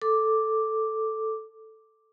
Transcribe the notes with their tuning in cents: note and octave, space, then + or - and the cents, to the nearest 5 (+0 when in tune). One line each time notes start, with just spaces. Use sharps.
A4 +0 D6 +0